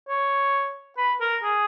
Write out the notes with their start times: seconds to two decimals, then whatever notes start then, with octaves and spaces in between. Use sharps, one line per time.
0.08 C#5
0.97 B4
1.21 A#4
1.43 G#4